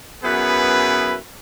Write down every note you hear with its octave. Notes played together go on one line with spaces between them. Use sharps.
F#2 B3 E4 G#4 B4